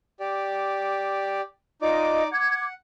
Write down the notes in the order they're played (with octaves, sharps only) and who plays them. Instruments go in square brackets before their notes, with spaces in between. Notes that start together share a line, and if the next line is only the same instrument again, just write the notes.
[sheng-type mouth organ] G4 D5
[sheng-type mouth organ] D#4 D5 D6 [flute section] F4 D#5
[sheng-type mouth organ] F#5 [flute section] D6 G#6